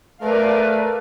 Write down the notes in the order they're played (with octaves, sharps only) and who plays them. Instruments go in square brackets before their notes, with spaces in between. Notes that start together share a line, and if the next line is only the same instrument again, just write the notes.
[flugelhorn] A3 [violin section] A#4 D5 F5 [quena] B4